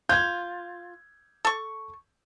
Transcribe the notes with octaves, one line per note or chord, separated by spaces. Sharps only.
F4 G6 G#6
A4 C#6